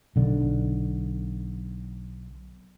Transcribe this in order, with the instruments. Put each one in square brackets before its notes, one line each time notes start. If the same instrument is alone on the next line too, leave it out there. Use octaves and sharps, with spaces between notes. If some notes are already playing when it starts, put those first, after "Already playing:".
[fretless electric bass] B1 D3